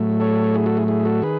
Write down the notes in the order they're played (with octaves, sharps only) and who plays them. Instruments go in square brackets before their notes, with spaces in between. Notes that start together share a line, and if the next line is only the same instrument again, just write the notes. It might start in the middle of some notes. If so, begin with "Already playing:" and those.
Already playing: [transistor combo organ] A2 F#3 A3
A4 C#5
E4 G#4
F#4 A4
E4 G#4
E4 G#4
F#4 A4
D#3 G#4 B4